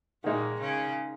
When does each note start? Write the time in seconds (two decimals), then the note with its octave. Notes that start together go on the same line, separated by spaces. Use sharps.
0.24 A#2 D#3 G#3 A#3 D#4
0.60 C#3 C#4